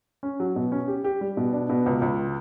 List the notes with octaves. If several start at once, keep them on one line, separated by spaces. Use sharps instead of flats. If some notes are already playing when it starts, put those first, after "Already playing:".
C#4
F#3
B2
C#4
G4
G4
G3
B2
D4
B2
C#2
C#2